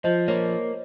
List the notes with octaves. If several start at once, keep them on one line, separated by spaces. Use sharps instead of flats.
F3 C5 D#5
A#3 C#5